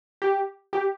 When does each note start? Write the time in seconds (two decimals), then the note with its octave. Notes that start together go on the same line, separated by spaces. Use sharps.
0.22 G4
0.73 G4